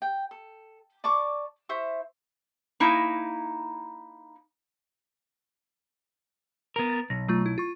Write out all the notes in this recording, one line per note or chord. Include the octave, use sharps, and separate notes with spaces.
G5
A4
D5 A5 C#6 D6
E4 C5 E5 C#6
A#3 D#4 E4
B3 A#4
A6
B1 A#6
F#3 A3 F4
E4
F4 C#6